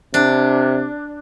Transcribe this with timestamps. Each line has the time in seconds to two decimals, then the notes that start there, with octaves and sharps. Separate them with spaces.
0.14 C3 D4